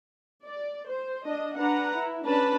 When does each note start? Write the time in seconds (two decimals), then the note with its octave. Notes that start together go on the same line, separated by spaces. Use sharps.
0.44 D5
0.89 C5
1.26 D4 D#5
1.57 D4 B4 F#5 A#5
1.97 E4
2.26 C#4 D4 B4 A5 B5